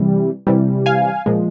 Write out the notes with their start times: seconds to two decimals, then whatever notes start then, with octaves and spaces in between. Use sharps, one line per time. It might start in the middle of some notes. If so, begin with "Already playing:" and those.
Already playing: C3 E3 G3
0.47 C3 E3 G3
0.86 F5 G#5
1.26 A#2 F3 G#3